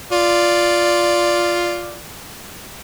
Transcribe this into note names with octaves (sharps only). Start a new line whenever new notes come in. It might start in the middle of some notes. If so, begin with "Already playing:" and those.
F4 D5